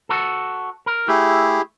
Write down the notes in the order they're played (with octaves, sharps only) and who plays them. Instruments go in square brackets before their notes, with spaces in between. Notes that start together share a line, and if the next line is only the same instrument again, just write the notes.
[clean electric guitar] F#4 A4
A#4
[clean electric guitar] A3 [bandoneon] E4 G4 G#4